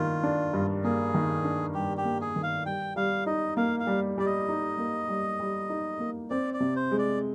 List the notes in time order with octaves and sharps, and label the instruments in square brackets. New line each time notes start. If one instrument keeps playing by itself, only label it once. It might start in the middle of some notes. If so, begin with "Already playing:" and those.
Already playing: [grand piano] G2 D#3 A#3 [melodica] F4
[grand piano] D4
G2
[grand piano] A#3 [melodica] G#4
[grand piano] D#3
D4
[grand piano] G2 [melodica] G4
[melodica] G4
[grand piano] A#3
[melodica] G#4
[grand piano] D#3
[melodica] F5
[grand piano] G3 [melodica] G5
[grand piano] G3 [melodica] F5
[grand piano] D#4 [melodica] D#5
[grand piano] A#3 [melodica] F5
[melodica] F5
[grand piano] G3
[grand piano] G3 [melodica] D5
[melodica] D#5
[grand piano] D#4
A#3
G3
G3
D#4
A#3
[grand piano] C4 [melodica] D5
[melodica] D5
[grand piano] C3
[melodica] C5
[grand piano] G#3
[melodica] D5